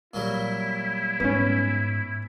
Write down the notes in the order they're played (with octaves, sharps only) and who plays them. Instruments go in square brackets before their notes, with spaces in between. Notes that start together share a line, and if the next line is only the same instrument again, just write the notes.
[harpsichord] A#2 F#3 G3 [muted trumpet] E4
[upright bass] G#2 [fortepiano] B3 C#4